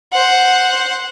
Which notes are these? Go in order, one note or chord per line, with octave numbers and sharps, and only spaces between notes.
C5 F#5